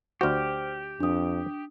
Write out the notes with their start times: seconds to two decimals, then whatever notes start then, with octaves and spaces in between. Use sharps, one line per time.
0.21 D2 F#4 G4 C5 F6
1.00 F2 D4 D#6